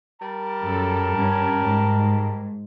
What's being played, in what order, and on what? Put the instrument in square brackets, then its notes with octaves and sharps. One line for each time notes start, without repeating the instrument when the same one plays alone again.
[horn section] G3 A#4 A5
[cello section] F#2 A4
G2 C#4
G#2